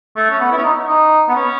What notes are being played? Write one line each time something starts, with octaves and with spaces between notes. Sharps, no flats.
A3
C#4
B3
E4
C#4
D#4
D#4
B3
C#4